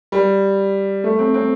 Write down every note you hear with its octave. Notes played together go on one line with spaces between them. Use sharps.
G3
A3
C4
C4